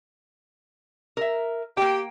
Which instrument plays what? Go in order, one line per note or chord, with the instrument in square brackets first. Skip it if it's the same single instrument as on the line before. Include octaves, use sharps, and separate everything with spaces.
[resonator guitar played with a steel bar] A#4 E5
[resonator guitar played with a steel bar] A#3 G5 [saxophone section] G4